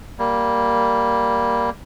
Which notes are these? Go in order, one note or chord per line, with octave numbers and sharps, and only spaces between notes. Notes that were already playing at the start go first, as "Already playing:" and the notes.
G3 A#3